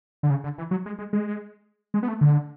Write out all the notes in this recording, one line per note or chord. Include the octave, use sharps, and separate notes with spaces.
D3
C#3
D3
E3
F#3
G#3
G#3
G#3
G#3
B3
A3
D3